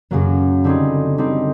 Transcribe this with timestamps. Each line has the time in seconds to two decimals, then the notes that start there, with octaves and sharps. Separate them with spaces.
0.11 F#2 C#3 F#3 A#3
0.64 D3 G3 C4 D#4 G#4
1.18 D3 G3 C4 D#4